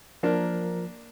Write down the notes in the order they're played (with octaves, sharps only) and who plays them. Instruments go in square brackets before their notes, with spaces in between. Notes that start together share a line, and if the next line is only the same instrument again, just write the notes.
[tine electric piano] F3 A#4 [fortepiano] A#3 D4